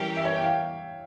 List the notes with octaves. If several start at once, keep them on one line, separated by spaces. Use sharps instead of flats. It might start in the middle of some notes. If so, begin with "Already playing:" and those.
Already playing: E3 G3 C#4 G4 A#4
E5
C#5
G5
F5